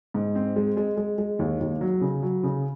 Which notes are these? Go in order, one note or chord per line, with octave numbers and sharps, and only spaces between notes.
G#2
C4
G#3
G#3
G#3
G#3
D#2
D#2
F#3
C#3
F#3
C#3